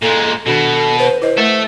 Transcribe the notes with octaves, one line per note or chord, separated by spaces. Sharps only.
A#2 G#3 A4
B2 D#3 D4 F#4 A4
B4 C5
E4 B4 C5 D#5
A3 A4 A#4 E5